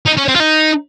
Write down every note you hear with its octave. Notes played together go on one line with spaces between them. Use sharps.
D#4
C#4
C4
F4
D#4